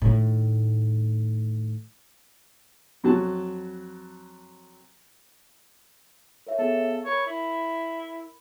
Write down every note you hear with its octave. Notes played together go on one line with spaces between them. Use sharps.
A2 D#3
F2 F#3 A5
A#4 C#5 E5
B3 G#4 A4
A#4 C#5 B5
E4